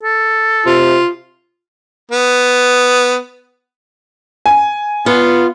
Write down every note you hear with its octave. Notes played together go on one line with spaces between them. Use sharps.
A4
C3 F4
B3
G#5
B3 F4